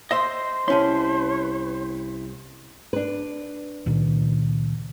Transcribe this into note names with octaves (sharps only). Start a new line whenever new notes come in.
C5 D#5 E5 C6
C2 C#4 E4 C#5 A5 C6
D4 B4
C#2 A#2 D#3